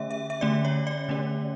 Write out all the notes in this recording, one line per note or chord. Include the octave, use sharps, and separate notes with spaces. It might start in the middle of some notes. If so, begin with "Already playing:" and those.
Already playing: D3 A3 C#4 E5
E5
E5
D3 A3 C#4 D5
C#5
D5
D3 A3 C#4